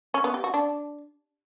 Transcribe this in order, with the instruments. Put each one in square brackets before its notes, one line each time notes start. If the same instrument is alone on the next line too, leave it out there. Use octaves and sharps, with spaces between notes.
[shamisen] C#4
B3
G4
F#4
D4